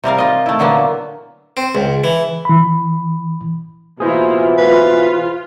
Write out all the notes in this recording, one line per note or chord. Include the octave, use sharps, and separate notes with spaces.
C3 G3 A#4 F5
F4 D#5
A3 E4
A#2 D3 F#3 A#3 B3
C4
C#2
E3
E3 B5
B2 E3 A#3 E4 F4 G#4 C5
F4 B4